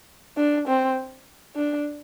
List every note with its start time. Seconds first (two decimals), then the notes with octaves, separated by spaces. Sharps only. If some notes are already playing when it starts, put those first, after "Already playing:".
0.37 D4
0.67 C4
1.56 D4